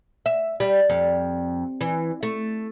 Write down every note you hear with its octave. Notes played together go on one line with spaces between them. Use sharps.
E5
G3
F2
E3
A3